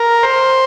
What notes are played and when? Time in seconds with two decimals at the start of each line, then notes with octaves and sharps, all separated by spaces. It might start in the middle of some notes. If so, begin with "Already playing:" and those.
Already playing: A#4
0.23 C5